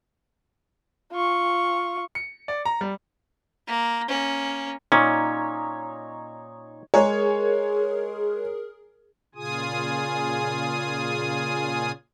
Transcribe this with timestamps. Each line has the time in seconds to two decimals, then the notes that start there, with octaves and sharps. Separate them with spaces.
1.13 F4 C#6
2.15 C#7
2.48 D5
2.65 A#5
2.81 G3
3.67 A#3
4.08 A#3 C#4
4.92 A#2 C#4 D#4 C#5
6.94 G#3 G#4 A#4 C#5
9.35 A#2 C#3 F4 G#4 G#5 D#6